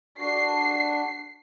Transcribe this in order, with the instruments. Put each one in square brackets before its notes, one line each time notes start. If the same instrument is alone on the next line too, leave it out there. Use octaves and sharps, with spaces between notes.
[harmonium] D4 F#4 [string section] C7